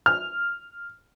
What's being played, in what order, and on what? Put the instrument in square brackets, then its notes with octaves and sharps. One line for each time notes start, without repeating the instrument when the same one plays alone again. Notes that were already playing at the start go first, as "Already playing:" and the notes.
[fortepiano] F6